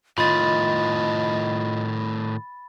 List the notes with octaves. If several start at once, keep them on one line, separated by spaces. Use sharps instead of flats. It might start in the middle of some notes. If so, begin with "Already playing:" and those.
A2 D#3 F4 D#5 B5 A6